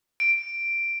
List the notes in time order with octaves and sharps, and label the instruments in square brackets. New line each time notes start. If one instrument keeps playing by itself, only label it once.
[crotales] D7